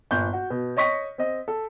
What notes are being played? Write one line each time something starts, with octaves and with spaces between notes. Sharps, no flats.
G1 A#2 G6
F#4
B2
C#5 D#5 C#6 B6
C4 D#5
A4